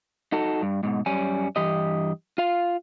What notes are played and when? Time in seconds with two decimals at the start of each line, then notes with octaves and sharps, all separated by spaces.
0.32 D#4 F#4 A4
0.62 G2
0.83 G#2 B2
1.06 F#2 G3 C#4 G#5
1.56 G2 E3 G4 D#5
2.38 F4 F5